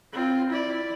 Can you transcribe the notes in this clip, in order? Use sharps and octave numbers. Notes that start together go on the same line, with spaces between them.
C4 F4
E4 D5